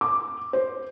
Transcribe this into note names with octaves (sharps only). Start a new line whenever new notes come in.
D6
C5